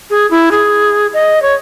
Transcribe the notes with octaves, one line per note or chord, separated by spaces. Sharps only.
G#4
E4
G#4
D#5
C#5